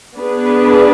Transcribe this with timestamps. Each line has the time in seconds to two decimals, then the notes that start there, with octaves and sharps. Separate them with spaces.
0.16 B3 D4 G#4 B4